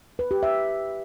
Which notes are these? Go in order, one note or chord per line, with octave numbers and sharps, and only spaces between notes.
B4
G4
E5